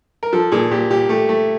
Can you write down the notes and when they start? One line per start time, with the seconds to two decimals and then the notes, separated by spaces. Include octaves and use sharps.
0.23 A#4
0.33 F3 A4
0.52 A#2 G#4
0.71 A#2 G4
0.90 A#2 G4
1.09 A3 G4
1.29 A3